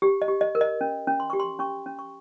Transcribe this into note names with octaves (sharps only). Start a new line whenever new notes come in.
G4
D#5
G4
D#5
A#4
D#5
C#4
C#4
C6
G4 C#6
C6
C#4 C#6
C#4
C#6